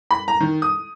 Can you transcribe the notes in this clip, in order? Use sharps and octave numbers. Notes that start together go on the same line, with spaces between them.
B5
A#5
D#3
D#6